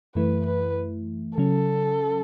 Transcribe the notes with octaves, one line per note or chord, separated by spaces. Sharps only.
F#2 E3 A3 E4 B4
B4
C#3 F#3 C#4 A4